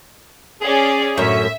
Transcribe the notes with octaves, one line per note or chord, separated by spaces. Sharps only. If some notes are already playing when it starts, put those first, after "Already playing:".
C#4 G#4 D5
F#2 A2 D3 C#4 E5